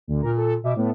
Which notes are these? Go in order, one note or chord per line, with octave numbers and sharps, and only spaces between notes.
D2 D3
A#2 A#4
A4
B2 E5 D6
A2 A3 B3